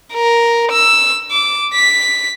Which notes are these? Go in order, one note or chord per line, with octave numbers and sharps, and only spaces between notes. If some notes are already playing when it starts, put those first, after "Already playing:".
A#4
E6
D6
B6